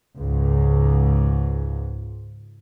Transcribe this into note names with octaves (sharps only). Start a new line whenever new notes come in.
C#2 G#2